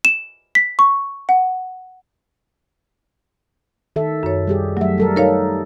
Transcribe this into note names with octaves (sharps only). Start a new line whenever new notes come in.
E7
B6
C#6
F#5
D#3 A4 E5
F#2 C#5
G3 G4 G#4
F#3 A3 E5
G3 A4 A#4
D#4 A4 A#4 C#5 F5